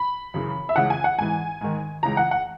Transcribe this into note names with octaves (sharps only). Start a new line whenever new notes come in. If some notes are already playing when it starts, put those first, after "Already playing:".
Already playing: B5
F#2 C#3 E3
E5
C#2 C#3 E3 F#5
G#5
F#5
G#2 E3 G#5
G#2 D#3
C#2 C#3 E3 A#5
F#5
F#5